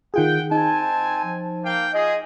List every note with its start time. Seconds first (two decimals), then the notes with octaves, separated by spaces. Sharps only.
0.14 D#3 F4 G#4 F#5 G5
0.51 C4 D#4 G#5 A5
1.24 F3
1.65 A#3 F5 G5
1.94 F4 G#4 D#5